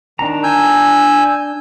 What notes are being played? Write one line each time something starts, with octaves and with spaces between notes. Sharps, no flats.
D#3 D4 A#5
G#5 E6 G6